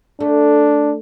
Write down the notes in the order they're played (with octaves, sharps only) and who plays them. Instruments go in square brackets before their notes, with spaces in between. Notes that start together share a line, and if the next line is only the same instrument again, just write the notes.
[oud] A3 [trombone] D4